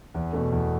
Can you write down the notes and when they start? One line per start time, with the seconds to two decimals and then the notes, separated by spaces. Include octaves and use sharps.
0.14 E2
0.33 B2 A3
0.52 E2